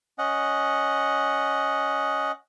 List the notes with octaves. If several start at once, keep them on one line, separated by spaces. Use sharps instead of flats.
C#4 D#5 F#5